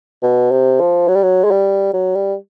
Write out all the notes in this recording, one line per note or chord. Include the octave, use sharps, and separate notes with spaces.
B2
C3
F3
F#3
G3
F#3
G#3
G3
F#3
G3